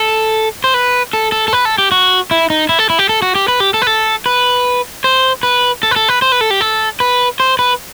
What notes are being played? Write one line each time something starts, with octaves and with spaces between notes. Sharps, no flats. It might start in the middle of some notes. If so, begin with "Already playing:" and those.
Already playing: A4
C5
B4
A4
A4
A4
B4
A4
G4
F#4
E4
D#4
E4
A4
E4
G4
A4
F#4
G4
B4
G4
A4
B4
A4
B4
C5
B4
A4
B4
A4
B4
C5
B4
A4
G4
A4
B4
C5
B4